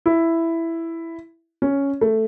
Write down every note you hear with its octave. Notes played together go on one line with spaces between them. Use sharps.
E4
C#4
A3